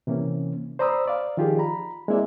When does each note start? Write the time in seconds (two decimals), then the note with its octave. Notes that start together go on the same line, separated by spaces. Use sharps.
0.07 C3 E3 A#3 C#4
0.79 C5 D5 A#5 B5 D#6 E6
1.07 D5 F5
1.37 D#3 F3 F4 G4 G#4
1.59 A#5 B5
2.08 G#3 A#3 C4 E4 D5 E5